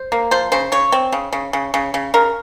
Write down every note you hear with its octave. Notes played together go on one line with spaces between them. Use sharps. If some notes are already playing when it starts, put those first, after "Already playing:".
Already playing: C5
A#3
F3 C5
C#3 C5
C#3 C#5
C4
C#3
C#3
C#3
C#3
C#3
C#3 A#4